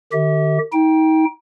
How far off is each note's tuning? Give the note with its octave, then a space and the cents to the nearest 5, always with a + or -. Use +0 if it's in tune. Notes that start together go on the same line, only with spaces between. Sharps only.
D#3 -40 G4 -25 E5 -40
D#4 +35 G5 +0